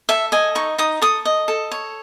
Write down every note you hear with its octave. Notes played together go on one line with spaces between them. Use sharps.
A4 E5
D#5 G#5
D#4 C#6
D#4 D#6
A4 D#6
D#5
A4
C#5